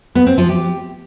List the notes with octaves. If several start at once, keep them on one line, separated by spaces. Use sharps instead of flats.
B3
C4
F3
G4